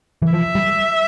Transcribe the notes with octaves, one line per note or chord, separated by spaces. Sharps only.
E3
F3 E5
G3